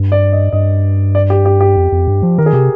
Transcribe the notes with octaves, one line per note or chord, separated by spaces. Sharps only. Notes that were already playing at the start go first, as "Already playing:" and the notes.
Already playing: G2
D5
D#5
G2 D#5
D5
G4
G4
G4
F2
F2
G2
F3
D#3 A#4
G#4
C3 G4